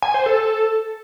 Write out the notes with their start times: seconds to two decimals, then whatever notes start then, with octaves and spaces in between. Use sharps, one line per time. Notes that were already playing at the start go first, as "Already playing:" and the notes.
0.02 G#5
0.14 C5
0.26 A4